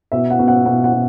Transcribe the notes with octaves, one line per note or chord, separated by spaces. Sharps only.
B2 E5
F#5
B2
F#5
B2 F#5
F#5
B2